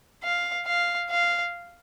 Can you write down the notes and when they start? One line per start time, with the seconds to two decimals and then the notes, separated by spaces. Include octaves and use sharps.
0.24 F5
0.66 F5
1.10 F5